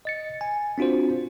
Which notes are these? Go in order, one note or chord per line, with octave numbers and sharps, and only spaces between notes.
D#5 A6 C#7
G#5
C4 D4 F4 F#4 C5